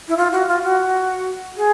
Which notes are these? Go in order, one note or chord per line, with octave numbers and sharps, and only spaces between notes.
E4
F4
F#4
F4
F#4
G#4